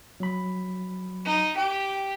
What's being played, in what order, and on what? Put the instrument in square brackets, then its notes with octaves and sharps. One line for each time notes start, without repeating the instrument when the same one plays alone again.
[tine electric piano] F#3 B5
[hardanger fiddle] D#4
[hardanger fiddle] G4 [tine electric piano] G5